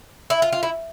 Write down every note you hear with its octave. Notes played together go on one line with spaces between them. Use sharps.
E4
F4
F4
E4